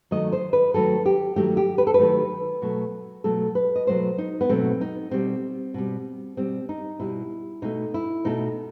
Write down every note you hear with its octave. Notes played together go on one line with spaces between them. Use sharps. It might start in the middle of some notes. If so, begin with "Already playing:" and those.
D#3 F#3 A3 D#5
C5
B4
D#3 F#3 A3 A4
G4
D#3 F#3 A3 G4
G4
B4
A4
B4
D#3 F#3 A3
B2 F#3 A3
B2 F#3 A3 A4
B4
D#5
B2 F#3 A3 C5
D#4
B3
B2 F#3 A3 C4
D#4
B2 G3 C4
B2 G3
B2 G3 C4
D#4
B2 G3 E4
B2 A3 D#4
E4
B2 A3 D#4